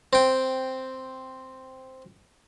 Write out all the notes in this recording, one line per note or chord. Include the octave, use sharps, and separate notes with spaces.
C4 G5